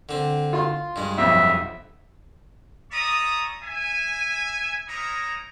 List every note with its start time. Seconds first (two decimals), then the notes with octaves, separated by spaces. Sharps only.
0.09 D3 C4
0.53 F4 C6
0.96 G2 G#3
1.18 B1 F2 E5
2.91 C#4 D5 E5 A#5 C#6 D#6
3.62 E5 G#5
4.87 A#3 D#4 E4 C#5 A#5 D#6